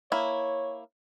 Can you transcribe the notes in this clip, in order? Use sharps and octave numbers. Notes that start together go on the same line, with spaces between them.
A#3 E4 C#5